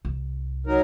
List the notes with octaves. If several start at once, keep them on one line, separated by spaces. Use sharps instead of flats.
C2
F#3 D#4 A#4